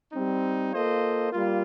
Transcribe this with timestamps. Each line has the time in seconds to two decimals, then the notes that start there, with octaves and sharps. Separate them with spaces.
0.11 G3 C4 D#4
0.72 A#3 F4 A4 C5 D#5
1.32 G3 A#3 F4